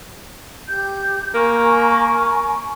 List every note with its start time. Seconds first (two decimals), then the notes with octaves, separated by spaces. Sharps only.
0.68 G4 G6
1.34 A#3 G#5 A#5 C#6